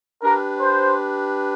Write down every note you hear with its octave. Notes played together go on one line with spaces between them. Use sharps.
D4 G4 A#4 B4
C5